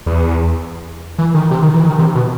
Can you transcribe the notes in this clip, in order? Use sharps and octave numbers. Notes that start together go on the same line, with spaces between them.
E2
E3
D#3
C3
D#3
E3
D#3
C3
B2